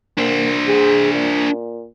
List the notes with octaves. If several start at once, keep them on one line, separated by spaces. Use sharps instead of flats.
A#3 D4 C5
G#4
A#2